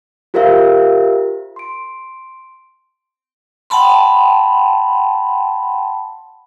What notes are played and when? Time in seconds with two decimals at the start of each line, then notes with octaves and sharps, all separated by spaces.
0.34 F4 G4 A#4 C5 E5 F5
1.56 C6 D7
3.70 F#5 G5 A5 B5 C6